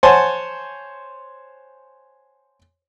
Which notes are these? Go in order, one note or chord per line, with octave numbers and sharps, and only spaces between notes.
C5 C#5 F#5 G#5 A5 C6